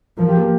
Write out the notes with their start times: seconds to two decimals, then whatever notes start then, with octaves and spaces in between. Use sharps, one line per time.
0.17 F3 A#4
0.28 G4
0.37 A#3